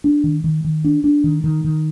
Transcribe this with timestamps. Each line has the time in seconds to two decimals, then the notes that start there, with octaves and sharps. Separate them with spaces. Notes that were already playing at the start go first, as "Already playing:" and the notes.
0.04 D4
0.24 D#3
0.44 D#3
0.64 D#3
0.84 D4
1.04 D4
1.24 D#3
1.44 D#3
1.64 D#3